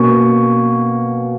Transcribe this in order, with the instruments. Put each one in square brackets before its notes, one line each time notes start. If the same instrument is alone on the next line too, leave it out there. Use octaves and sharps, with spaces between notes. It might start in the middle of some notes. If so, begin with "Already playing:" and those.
Already playing: [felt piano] B2 A#3 C#4 C#6